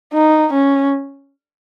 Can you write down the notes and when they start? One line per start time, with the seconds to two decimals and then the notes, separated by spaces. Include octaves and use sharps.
0.13 D#4
0.52 C#4